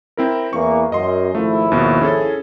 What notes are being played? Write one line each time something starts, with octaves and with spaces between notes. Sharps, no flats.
C4 E4 A#4
E2 E3 A#3 C#6
F#2 D#5 C6
G#1 F3 A3 E4
D#2 B2 B3
C#4 G#4 A4